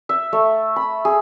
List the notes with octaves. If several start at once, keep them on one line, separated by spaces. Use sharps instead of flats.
E5
A3
B5
G#4